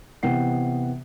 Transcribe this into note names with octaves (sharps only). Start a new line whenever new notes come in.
C3 E3 B3 F#5 G5 C7